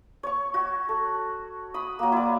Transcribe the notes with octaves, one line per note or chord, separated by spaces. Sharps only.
C#5 C#6
F#4
A4
B5 D#6
F#3 A#3
E4 D5